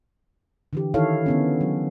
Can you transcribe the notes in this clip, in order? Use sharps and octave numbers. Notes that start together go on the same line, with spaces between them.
D3 E3 G4
D#3 E3 E4 A4 C#5 F5
D3 B3 C#4
F#3